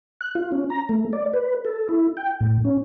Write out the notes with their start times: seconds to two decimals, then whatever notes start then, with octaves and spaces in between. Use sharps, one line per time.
0.21 F#6
0.35 F4
0.52 C#4
0.70 A#5
0.89 A3
1.13 D5
1.33 B4
1.65 A4
1.89 E4
2.17 G5
2.41 A2
2.65 C#4